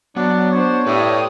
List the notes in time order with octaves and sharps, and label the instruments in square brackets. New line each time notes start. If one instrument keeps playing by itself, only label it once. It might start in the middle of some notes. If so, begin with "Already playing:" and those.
[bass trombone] F#3 [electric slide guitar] B3 [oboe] D4
[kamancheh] D4 C5 [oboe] C#5
[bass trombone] A2 [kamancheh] G4 D#6 [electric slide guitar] B4 D5